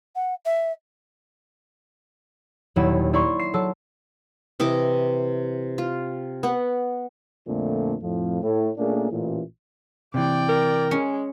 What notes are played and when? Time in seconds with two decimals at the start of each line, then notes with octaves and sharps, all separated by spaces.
0.15 F#5
0.45 E5
2.76 D#1 D#2 F#3 B3 E4 E7
3.13 E4 D5 A#5 C6 C#6
3.39 C7 E7
3.54 F#3 A4 A5 E6
4.60 C3 E3 D#5 D6
5.78 F4
6.43 B3 F#5
7.47 F2 A#2 D3 A3
8.02 F2 A2 F3
8.43 A2
8.78 A#2 A3 A#3 C#4 D4 G#4
9.11 A1 A#2 E3
10.14 C3 E3 D5 G5
10.49 A#4
10.91 G#3 C#4